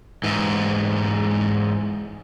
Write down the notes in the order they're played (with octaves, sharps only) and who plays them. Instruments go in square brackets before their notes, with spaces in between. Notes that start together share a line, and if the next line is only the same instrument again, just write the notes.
[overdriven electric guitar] G#2 E3